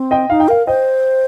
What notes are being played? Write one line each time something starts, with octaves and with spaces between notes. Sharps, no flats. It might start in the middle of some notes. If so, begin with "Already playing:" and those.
Already playing: C4
D#5 G5
D#4 F5
G5
A#4 F5
C5 D#5 G5